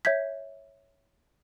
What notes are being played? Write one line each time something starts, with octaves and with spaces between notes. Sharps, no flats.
C#5 E5 G6 G#6 B6